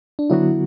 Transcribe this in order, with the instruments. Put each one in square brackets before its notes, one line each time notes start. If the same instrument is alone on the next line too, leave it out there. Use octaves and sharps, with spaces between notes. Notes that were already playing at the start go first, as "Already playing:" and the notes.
[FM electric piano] D4
[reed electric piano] D3 F#3 B3 F#4 [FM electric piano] E4